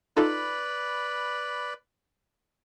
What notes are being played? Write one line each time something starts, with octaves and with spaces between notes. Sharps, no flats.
D#4 F4 A4 B4 D5 B5